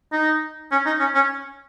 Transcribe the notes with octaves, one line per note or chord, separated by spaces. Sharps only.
D#4
C#4
D#4
C#4
C#4